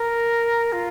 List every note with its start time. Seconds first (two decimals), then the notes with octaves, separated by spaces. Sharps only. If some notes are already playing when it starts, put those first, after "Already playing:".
Already playing: A#4
0.72 F4